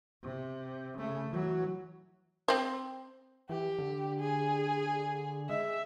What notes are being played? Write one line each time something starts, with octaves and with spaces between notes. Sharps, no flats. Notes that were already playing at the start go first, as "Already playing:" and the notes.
C3
C#3 A3
E3 F#3
C4 C5
E3 G4
D3
G#4
G#3 E5